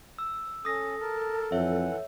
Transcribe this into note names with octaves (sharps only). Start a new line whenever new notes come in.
E6
C#4 A4 D#6 A#6
A#4 A5
F2 E3 C#5 E5 F#5